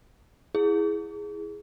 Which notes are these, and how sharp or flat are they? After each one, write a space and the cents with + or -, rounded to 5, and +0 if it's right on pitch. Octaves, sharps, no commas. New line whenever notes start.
E4 +0 G#4 +0